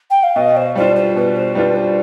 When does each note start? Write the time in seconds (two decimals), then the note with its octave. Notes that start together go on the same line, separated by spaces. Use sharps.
0.10 G5
0.23 F5
0.36 B2 D#5
0.56 C5
0.75 G3 D4 F4 C5
0.96 C5
1.16 B2 B4
1.36 C5
1.55 G3 D4 F4 B4
1.76 C5